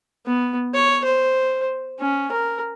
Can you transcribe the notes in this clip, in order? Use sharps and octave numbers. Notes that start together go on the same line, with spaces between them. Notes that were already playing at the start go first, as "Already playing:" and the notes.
B3
C#5
C5
C#4
A#4